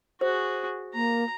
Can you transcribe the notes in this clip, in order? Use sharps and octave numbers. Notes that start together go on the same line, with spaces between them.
F#4 G#4 C5
A#3 A#5